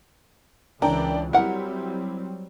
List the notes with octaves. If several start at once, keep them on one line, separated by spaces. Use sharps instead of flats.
C#2 C#3 E3 D4 A#4 G5
F#3 G3 C4 E4 G4 A#4 F#5